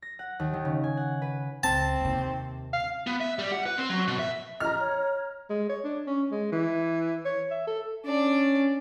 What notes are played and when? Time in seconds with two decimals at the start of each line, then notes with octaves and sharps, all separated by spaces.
0.02 A#6
0.19 F#5
0.40 D#2
0.53 D#3
0.65 C#3
0.84 G#5
0.97 F#5
1.22 B4
1.63 C#2 C4 A5
2.01 D#2 C3
2.73 F5
3.07 B3
3.21 E5
3.39 G3
3.52 F#5
3.66 B4
3.78 C4
3.90 F#3
4.08 B2
4.19 E5
4.60 D#5 A#5 F6
4.80 C#5
4.97 C#5
5.50 G#3
5.70 C#5
5.84 D4
6.07 C#4
6.31 G#3
6.52 E3
7.25 C#5
7.51 E5
7.67 A4
8.05 C#4 D4 D5